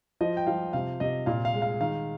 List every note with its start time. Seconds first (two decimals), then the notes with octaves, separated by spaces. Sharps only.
0.21 F3 D#5
0.37 G5
0.47 F3 F5
0.73 C3 F5
1.00 C3 D#5
1.26 A#2 F5
1.45 F5
1.54 G#3
1.62 F5
1.80 D#3 F5